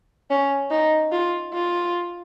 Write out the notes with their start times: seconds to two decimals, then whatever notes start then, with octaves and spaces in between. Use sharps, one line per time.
0.30 C#4
0.70 D#4
1.12 F4
1.53 F4